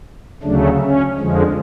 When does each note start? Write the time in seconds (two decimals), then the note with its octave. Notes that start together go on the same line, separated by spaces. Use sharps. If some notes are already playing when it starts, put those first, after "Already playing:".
0.43 D2 C#3 F#3 A3 D4
0.80 C#4
1.17 F2 D3 F3 G#3